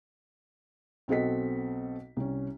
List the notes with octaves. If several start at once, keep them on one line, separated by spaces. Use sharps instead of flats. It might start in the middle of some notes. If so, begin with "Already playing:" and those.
B1 C4 F#4 A4 D#5 B6
C2 C#4